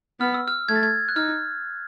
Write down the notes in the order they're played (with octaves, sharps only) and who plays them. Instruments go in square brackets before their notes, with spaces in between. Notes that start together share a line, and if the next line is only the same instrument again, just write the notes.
[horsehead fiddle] B3 [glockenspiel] F6
[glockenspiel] E6
F6
[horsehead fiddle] A3 [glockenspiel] G#6
[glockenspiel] A6
G#6
F#6
[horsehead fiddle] D#4 [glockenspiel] F6